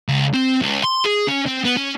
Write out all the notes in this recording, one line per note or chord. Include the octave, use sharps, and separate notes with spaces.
C#2
C4
C#2
C6
G#4
C#4
C4
B3
C#4